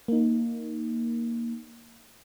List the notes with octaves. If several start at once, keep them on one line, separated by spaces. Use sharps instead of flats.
A#3 D#4